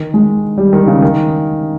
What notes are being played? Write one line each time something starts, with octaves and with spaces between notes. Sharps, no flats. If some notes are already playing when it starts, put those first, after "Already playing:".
Already playing: D#3
G#3
G3
D#3
C#3
D#3